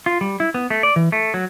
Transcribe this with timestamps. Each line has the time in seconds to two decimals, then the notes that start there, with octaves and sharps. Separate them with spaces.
0.06 F4
0.21 G3
0.40 E4
0.54 B3
0.70 A3
0.83 D5
0.96 E3
1.12 A3
1.34 F#3